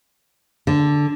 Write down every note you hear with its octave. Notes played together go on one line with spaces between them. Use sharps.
D3